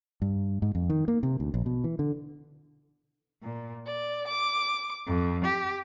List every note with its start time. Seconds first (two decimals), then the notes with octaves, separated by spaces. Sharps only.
0.22 G2
0.62 G#2
0.75 F2
0.90 D#3
1.08 A#3
1.23 C3
1.40 D2
1.54 A#1
1.66 B2
1.84 E3
1.99 D3
3.43 A#2
3.86 D5
4.27 D6
5.07 F2
5.44 G4